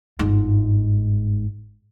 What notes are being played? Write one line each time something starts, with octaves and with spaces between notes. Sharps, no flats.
G1 G#2